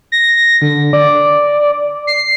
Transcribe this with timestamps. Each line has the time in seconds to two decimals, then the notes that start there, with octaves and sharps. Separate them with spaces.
0.12 A#6
0.62 D3
0.93 D5
2.07 C7